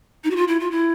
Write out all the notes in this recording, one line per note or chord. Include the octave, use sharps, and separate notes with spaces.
D#4
F#4
F4
E4
F4
E4